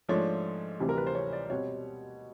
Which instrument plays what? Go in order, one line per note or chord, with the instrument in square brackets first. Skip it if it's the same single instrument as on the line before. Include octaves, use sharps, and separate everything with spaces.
[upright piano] G#2 F3 A3 D4 C#5
D2 C3 E3 G3 C4
A#4
B4
C5
C#5
D5
B2 G3 C4 C#5